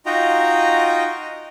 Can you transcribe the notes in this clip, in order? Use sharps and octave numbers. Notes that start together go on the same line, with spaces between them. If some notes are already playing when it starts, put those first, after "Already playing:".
D#4 F4 F#4 D#5 G5 A#5